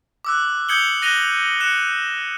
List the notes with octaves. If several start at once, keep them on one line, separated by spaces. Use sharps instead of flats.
D6 E6 F#6
D#6 G6 G#6 C#7 F#7 G7
F#6 A#6 D#7 F7 G7
F#6 C#7 E7